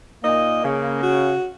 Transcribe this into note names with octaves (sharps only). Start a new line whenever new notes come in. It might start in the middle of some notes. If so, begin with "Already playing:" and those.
A#2 A#3 D#4 D#5
C#3
F#4